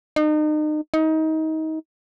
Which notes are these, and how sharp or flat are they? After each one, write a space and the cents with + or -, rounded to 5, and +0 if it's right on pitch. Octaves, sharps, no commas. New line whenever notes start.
D#4 -35
D#4 +25